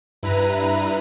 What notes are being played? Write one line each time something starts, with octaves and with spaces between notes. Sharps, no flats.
G2 E4 B4 A#5 D#7